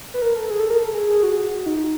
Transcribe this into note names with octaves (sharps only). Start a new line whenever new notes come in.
B4
A#4
A4
G#4
A4
A#4
A4
G#4
G#4
F#4
F#4
F#4
D#4